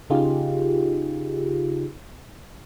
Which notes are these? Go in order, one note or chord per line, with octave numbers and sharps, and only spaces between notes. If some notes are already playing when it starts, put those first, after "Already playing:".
C#3 D#4 F4 G4 G#4